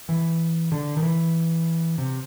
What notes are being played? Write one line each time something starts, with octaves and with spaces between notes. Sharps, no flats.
E3
D3
D#3
E3
C3